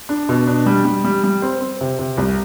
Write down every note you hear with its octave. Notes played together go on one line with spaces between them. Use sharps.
D4
B2
D4
G3
G3
G3
G3
C4
C4
C3
C3
C2